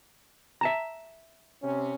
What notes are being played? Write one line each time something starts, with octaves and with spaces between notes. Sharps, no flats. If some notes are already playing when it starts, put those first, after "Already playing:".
E5 A5 A#5
C3 C#4